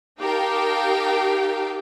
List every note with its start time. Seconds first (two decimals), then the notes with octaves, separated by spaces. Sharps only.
0.20 D#4 G4 A#4 F5 G5 A5